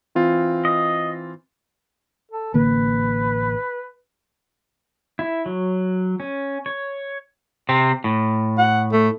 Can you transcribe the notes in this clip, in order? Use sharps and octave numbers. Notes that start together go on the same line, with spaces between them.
E3 C4 F4
D#5
A4
A1 D3 A#3 B4
E4
F#3
C#4
C#5
C3 C4
A2
F#5
A3